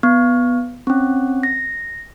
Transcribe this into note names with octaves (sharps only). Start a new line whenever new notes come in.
B3
C4 C#4
A#6